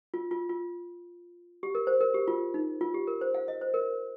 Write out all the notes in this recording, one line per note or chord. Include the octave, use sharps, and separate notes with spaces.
F4
F4
F4
G4
A#4
C5
A#4
G4
F4
D#4
F4
G4
A#4
C5
F5
D#5
C5
A#4